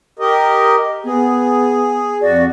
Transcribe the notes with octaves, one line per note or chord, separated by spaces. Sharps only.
G4 A#4 D#5
B3 G#4
F2 F#4 D5